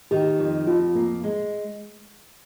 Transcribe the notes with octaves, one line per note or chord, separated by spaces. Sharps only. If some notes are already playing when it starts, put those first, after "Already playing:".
D#3 G4
F2
F2 F4
A#3
G#3